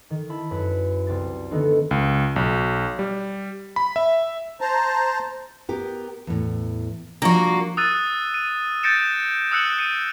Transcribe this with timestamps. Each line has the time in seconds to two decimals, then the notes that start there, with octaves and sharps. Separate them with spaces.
0.10 D#3
0.29 E4 A5 B5
0.51 F#2 B4 B6
1.07 C2 G4 A6
1.50 D3 D#3 A3 B3 D4 D#4
1.91 C#2
2.36 B1
2.99 G3
3.76 B5
3.96 E5
4.61 C5 A5 A#5
5.69 B3 G4 A#4
6.27 E2 A2
7.22 F3 G3 A#3 D4 F#4
7.77 D#6 E6 F#6 A6 D#7
8.34 D#7
8.83 G6 A6 A#6 C#7 D7 E7
9.52 D#6 E6 F#6 C#7 E7 F#7
9.79 C#7 D#7